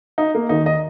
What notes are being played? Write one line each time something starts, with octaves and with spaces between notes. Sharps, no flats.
D#4
A#3
D#2 D#3 D#4
D#5